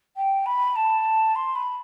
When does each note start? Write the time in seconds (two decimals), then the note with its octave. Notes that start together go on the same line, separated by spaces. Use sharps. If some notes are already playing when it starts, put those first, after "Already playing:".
0.16 G5
0.46 B5
0.75 A5
1.35 C6
1.55 B5